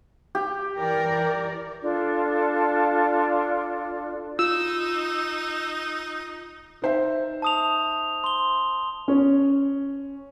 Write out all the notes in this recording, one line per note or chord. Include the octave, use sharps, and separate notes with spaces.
G4
E3 A#4 D5
D4 F4 A4
D#4 F4 E6
D#4 C5 E5
A5 D#6 F7
C6 G7
C#4